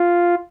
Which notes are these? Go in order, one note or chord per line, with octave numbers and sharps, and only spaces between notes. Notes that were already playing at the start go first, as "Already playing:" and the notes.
Already playing: F4